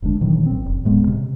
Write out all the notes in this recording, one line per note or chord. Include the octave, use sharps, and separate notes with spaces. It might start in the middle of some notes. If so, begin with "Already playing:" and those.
F1 D2 G#3 D4
A#2 D#3 E3 F#3
A1 C4
F1
D#1 A2 G#3 B3
C3